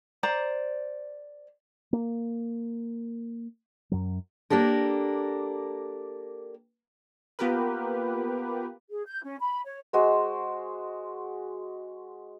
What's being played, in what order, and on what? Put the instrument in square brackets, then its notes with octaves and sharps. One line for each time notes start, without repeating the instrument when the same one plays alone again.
[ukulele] C5 D5 A#5
[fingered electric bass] A#3
F#2 F#3
[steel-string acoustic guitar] A#3 D4 G4 A4 A#4
[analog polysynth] A#3 B3 F4 G4 A#4 B4
[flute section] G#4
G6
C#4
B5
C#5
[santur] G#3 F#4 C5